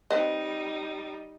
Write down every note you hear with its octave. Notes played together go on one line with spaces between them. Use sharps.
G3 C4 D#4 B4 D#5